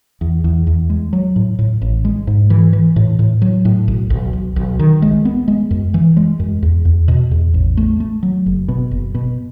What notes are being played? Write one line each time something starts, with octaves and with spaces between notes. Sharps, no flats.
E2
E2
E2
G#3
F#3
A2
A2
A1
G#3
G#2
E3
E3
A2
A2
F#3
A2
B1
B1
B1
B1
D#3
G#3
B3
G#3
F#2
E3
G#3
F#2
E2
E2
B2
E2
A1
A3
A3
F#3
F#1
B2
F#1
B2